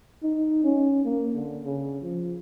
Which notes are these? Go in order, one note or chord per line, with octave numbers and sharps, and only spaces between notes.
D#4
C#4
A#3
D3
C#3
F3